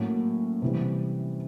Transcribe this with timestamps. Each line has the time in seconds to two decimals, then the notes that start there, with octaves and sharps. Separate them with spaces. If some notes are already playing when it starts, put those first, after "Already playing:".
Already playing: A2 F#3 A#3 C#4
0.62 C3 E3 G3